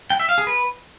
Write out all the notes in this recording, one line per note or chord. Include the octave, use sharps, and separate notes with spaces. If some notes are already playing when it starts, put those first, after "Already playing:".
G5
E5
F5
G#4
B4